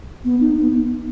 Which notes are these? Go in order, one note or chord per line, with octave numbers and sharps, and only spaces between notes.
B3
D#4
B3